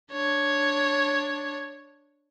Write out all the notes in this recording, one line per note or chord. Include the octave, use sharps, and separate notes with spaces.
D4 C#5